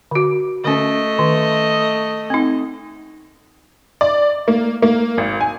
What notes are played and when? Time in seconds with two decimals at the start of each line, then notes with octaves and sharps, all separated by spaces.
0.11 D3 F#4
0.64 D3 A3 C#4 D#5
1.19 D#3
2.30 C4 D#4
4.01 D5
4.48 A#3
4.82 A#3
5.18 G#1
5.41 G#5